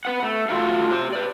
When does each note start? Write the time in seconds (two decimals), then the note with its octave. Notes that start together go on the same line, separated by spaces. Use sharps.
0.05 B4 F#5
0.23 A3
0.49 A3 F4 F#4 A4 F5
0.90 G4 C5
1.13 B4 D5